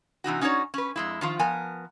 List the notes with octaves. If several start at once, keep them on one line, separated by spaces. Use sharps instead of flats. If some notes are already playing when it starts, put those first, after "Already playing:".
C3 E3 D#4 F#4
C#4 D#4 F#4 A#4 C#5 D5
C#4 B4
F2 G#3 E4
D#3 F3 F4
F3 B3 A#4 G#5